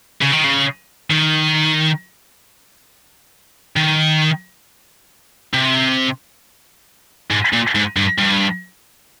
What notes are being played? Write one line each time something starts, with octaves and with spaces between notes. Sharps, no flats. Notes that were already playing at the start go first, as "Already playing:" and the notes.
C#3
D#3
C#3
D#3
D#3
C3
G#2
A#2
G#2
G2
G2